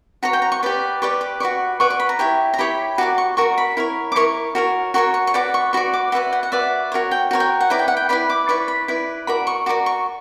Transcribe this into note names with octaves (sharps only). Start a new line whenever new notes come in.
F#4 C#5 A#5
G5
A#5
C#6
G4 B4 D5
G4 B4 D5 C#6
D6
F#4 B4 D5 C#6
F#4 B4 D5 C#6
C#6
B5
A#5
E4 G4 C#5
A#5
E4 G4 C#5 B5
F#4 A#4 D5 D6
C#6
F#4 A#4 D5 C#6
B5
E4 A#4 C#5
D6
E4 A#4 C#5 C#6
F#4 A#4 C#5
F#4 A#4 C#5 C#6
C#6
C#6
F#4 B4 D5 D6
C#6
F#4 B4 D5 C#6
D6
F#4 B4 D5 E5
F#5
F#5
F#4 B4 D5 E5
F#4 A#4 C#5
G5
F#4 A#4 C#5
G5
F#5
E4 B4 D5 A#5
G5
F#5
G5
E4 B4 D5 B5
D6
E4 B4 D5 C#6
B5
E4 B4 D5
F#4 A#4 D5 B5
C#6
F#4 A#4 D5 D6
C#6